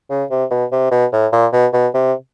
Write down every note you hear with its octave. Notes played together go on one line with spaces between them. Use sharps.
C#3
C3
B2
C3
B2
A2
A#2
B2
B2
C3